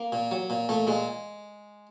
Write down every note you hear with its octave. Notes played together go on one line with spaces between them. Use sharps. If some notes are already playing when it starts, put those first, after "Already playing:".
Already playing: A#3
A#2
F#3
A#2
A#2 A3
A#2 G#3